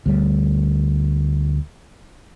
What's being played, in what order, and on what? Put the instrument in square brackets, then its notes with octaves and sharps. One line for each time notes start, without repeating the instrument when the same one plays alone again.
[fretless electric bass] D2 G3